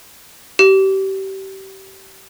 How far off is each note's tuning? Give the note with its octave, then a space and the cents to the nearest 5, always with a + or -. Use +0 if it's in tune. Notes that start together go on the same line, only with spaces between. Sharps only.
G4 -30